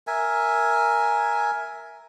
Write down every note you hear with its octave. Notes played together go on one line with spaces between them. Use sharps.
A#4 E5 G#5